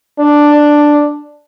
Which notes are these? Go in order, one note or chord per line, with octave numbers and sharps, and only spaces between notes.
D4